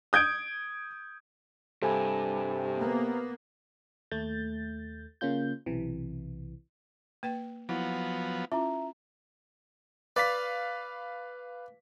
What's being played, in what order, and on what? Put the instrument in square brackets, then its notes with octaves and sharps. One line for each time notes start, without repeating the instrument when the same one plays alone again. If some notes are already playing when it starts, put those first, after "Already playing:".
[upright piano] D#6 G6 G#6 D7
[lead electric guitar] G2 [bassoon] C3 [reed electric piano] A4 G#5
[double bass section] A#3 B3
[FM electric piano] D#2 A3 G6 A6
C#3 A#3 C#4 F4 G6
B1 C3 E3
[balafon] A#3 B4 G5
[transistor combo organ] F3 F#3 B3 [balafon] E4
[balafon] C#4 E4 F4 [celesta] E5 A#5
[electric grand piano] B4 F5 B6 [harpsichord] D5